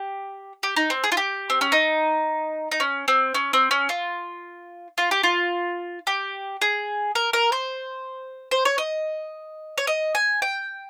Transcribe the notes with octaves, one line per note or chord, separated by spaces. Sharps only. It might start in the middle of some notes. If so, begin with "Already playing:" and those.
Already playing: G4
G4
D#4
C4
G#4
F4
G4
C4
C#4
D#4
D#4
C#4
C4
C#4
C4
C#4
F4
F4
G4
F4
G4
G#4
A#4
A#4
C5
C5
C#5
D#5
C#5
D#5
G#5
G5